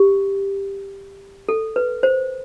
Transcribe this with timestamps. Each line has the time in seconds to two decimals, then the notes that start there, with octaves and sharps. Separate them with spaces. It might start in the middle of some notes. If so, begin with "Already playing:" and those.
Already playing: G4
1.49 A4
1.76 B4
2.03 C5